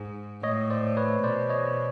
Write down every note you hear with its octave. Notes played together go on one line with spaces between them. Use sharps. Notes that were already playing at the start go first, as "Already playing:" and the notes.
Already playing: G#2
A2 C#5 D#5
C5 D5
B4 C#5
B2 C5 D5
C#5 D#5